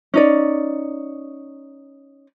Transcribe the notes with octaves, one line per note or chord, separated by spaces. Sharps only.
C#4 D#4 D5